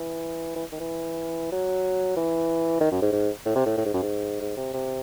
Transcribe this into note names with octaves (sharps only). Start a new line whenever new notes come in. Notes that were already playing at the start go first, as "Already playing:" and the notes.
Already playing: E3
E3
D#3
E3
F#3
E3
D#3
F#2
G#2
G#2
A2
C3
A2
A2
G#2
F#2
G#2
G#2
C3
C3